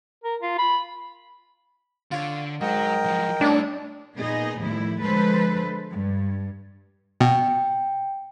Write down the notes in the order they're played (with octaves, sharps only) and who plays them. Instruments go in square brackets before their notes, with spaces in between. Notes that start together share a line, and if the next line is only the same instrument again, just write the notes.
[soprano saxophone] A#4
F4
B5
[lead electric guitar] D3 [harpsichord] F4 C#5
[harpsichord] G#2 [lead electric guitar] F#3 [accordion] A#4 D#5 G5
[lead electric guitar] F3 F#3
[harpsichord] A2 A3 E4 [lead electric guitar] G3 C#4 [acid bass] D4
[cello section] A#2 B3 D#4 G#4 D#5
D#2 A2 F3 G3 E4
D3 F3 G#3 A4 B4 C5
G2
[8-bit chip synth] B2 [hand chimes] G5